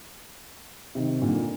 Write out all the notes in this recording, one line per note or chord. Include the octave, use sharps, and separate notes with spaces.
C3 D#3
A#2 D3